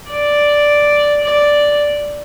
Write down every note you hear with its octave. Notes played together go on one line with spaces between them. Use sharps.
D5
D5